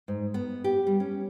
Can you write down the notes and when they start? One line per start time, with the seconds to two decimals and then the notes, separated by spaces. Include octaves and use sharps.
0.08 G#2
0.34 B3
0.64 G4
0.87 G3
1.00 C#4